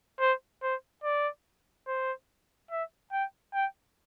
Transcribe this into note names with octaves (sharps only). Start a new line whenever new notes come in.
C5
C5
D5
C5
E5
G5
G5